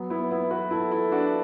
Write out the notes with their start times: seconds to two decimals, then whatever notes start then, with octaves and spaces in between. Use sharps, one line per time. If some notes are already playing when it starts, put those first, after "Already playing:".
Already playing: F#3 B3
0.10 B3 E4
0.31 B3 E4
0.51 F#4 B4
0.71 E4 A4
0.91 E4 A4
1.12 D4 F#4